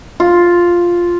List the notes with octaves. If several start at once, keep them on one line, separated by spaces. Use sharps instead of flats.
F4